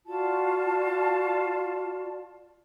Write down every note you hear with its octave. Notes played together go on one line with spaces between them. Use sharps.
F4 F#4 D5 A5